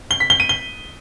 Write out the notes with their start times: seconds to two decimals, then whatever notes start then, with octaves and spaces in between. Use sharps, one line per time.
0.11 G7
0.20 B6
0.30 G7
0.40 D#7
0.49 G7